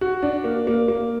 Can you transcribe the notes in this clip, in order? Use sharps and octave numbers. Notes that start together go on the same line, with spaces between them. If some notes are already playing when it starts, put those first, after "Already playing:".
F#4
D4
A#3
A#3
A#3